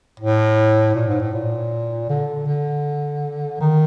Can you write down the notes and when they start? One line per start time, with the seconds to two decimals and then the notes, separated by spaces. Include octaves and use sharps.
0.20 A2
0.95 A#2
1.08 G#2
1.20 A2
1.33 A#2
2.09 D3
2.47 D3
3.61 D#3